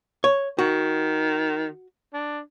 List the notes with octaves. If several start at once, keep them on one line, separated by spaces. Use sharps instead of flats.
C#5
D#3 F#4
D4